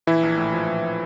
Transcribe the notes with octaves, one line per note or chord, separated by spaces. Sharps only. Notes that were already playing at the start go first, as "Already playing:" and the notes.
A#1 E3 E4
A#1
A2
F3
A#1